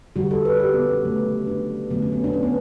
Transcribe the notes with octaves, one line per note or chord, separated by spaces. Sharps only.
D3 G3 F#4
A4
B4
G4
B3
C#4
C#3 F#3 A3
D4
D3 F#3 A3 B3
C#4
B3
D4
C#4
B3